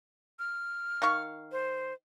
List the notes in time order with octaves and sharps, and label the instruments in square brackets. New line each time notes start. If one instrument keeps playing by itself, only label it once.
[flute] F6
[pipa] D#3 F5 C#6
[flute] C5